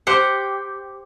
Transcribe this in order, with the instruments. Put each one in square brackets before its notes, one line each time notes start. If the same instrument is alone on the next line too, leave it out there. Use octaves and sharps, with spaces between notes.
[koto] G4 C5 F#5